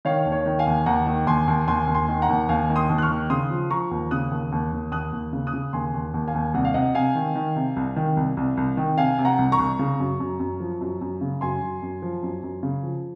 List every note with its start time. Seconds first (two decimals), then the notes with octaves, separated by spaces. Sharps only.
0.05 D#3 C#5 F5
0.26 D#2
0.32 C#5
0.46 D#3
0.59 F5 G#5
0.67 D#2
0.86 D#2 F#5 A#5
1.06 D#3
1.26 D#2 G#5 C6
1.48 D#2
1.68 D#2 G#5 C6
1.87 D#2
1.95 G#5 C6
2.08 D#3
2.22 F#5 A#5
2.29 D#2
2.49 D#2 F5 G#5
2.69 D#3
2.76 C6 D#6
2.90 D#2
2.98 F#6
3.02 C#6 F6
3.10 D#3
3.30 C#3 C6 D#6
3.50 F3
3.71 F3 A#5 C#6
3.91 D#2
4.11 C#3 D#6 F#6
4.31 D#2
4.52 D#2
4.72 D#2
4.92 D#2 D#6 F#6
5.12 D#2
5.33 C#3
5.47 D#6 F#6
5.53 C#3
5.73 D#2 G#5 C6
5.94 D#2
6.14 D#2
6.27 F5 G#5
6.34 D#2
6.54 C2 F#5
6.65 F5
6.74 C3 D#5 F#5
6.95 C3 F5 G#5
7.15 D#3
7.35 D#3
7.56 C3
7.76 C2
7.96 D#3
8.17 C2
8.37 C2
8.57 C2
8.77 D#3
8.98 C3 F5 G#5
9.18 C3
9.25 F#5 A#5
9.39 C2
9.52 A#5 C#6
9.59 C2
9.79 C#3
10.00 F#2
10.20 F#2
10.40 F#2
10.60 F3
10.81 F#2
11.01 F#2
11.21 C#3
11.41 F#2 G#5 C6
11.62 F#2
11.82 F#2
12.02 F3
12.23 F#2
12.43 F#2
12.63 C#3
12.83 F3